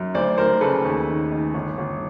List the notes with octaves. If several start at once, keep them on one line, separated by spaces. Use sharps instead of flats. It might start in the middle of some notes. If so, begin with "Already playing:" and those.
Already playing: F#2
D2 C5 D5
D2 A#4 C5
C#3 A4 B4
D#2
D#3
D#3
G1
G1